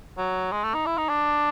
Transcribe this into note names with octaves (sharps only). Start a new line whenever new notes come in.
F#3
G#3
A3
D#4
E4
D#4
D4